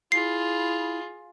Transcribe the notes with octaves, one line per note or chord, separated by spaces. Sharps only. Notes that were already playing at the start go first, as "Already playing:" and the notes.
E4 F4 G#4 C7